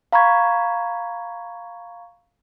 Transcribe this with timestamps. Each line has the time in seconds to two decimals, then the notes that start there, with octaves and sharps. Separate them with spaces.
0.13 F5 A#5 B5 C#6 G#6